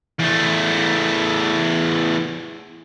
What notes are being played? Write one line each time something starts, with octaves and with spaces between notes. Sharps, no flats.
E2 A3